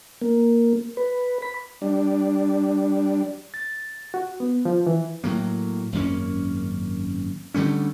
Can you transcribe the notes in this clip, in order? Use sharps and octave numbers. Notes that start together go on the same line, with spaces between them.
A#3
B4
B5
G3 D4
A6
F#4
B3
F3
E3
A2 F#3 A#3
G#1 F#2 A#3 C#4
D3 G3 A3 C#4